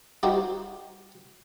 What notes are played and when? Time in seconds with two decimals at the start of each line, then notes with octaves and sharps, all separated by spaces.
0.23 G3 D#4 F#4 G4 C5